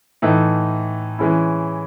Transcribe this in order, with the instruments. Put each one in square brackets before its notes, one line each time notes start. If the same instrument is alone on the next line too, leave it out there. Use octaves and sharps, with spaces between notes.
[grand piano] A2 E3 A3 D#4
E3 G#3 C#4 E4